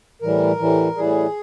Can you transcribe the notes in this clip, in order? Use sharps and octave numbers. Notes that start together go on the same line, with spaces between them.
A2 E3 G3 A#4
A2 E3 G3
A2 E3 G3 G#4